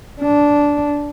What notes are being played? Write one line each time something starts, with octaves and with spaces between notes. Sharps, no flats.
D4